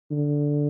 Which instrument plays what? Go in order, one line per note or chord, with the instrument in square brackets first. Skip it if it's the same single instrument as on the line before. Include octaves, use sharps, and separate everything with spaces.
[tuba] D3